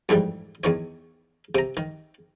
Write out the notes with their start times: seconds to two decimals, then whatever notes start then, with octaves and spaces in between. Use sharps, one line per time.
0.09 F2 G#2 E3 G3
0.64 E2 D#3 C#5
1.55 C3 A#5
1.77 D#3